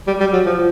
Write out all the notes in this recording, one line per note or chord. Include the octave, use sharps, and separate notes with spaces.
G3
G3
F#3
F3